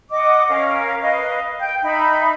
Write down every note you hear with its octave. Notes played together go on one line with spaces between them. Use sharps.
D#5 F#5 D6
C#4 A#4 F5
B4 D#5 F5
G5 G6
D#4 E5 B5